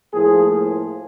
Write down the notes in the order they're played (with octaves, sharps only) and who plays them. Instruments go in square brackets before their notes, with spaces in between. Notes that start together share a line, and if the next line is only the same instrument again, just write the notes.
[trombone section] A2 F3 A#3 G#4